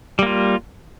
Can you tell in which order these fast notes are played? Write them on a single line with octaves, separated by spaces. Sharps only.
G3 A#3 F4